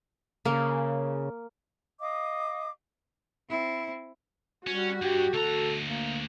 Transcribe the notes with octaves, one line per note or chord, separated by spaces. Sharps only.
C#3 A#3
D#5 F5 D6 D#6
C4 E4
G3 C#4 F#4
G2 G4
D2 A4 A#5
A#3